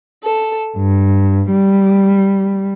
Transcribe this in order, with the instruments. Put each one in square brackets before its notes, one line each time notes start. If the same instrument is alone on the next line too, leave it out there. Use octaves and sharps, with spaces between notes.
[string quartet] A4
G2
G3